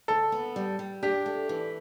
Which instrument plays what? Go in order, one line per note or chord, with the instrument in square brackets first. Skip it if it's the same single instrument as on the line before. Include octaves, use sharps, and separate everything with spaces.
[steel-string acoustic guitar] D2 [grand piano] A4
[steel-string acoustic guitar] B3
G3
G3
[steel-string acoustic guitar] D4 [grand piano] G4
[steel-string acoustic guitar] A3
E3